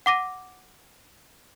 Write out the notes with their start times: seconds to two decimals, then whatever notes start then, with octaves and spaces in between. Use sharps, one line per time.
0.06 F#5 D6 A#6 D#7